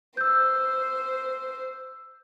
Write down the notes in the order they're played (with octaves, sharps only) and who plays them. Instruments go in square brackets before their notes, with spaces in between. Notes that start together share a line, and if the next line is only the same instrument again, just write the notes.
[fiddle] C5 [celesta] E6 G6